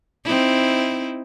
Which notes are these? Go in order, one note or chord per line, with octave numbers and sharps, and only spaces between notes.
C4 D#4 E4